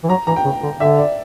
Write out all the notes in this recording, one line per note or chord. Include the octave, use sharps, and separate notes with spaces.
E3
F#3 A#5
E3 A#5
G5
C#3
D3
D3 E5
D5